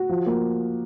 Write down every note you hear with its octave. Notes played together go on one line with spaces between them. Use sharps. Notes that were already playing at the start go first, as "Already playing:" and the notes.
Already playing: F#4
F3
A#3